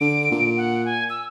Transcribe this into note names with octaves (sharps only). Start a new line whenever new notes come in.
D3 D7
A#2
F#5
G#5
E6